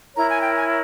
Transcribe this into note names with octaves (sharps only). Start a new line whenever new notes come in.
E4 A#4 C#5 A#5
G#5
G5
G#5